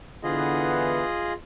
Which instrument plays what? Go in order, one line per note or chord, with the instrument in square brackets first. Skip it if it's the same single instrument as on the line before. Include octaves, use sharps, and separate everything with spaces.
[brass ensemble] D3 E3 B3 [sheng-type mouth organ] F4 G#4 D#5